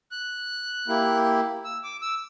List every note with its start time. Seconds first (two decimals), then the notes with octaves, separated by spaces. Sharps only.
0.11 F#6
0.88 A#3 E4 G4
1.64 E6
1.83 D6
2.02 E6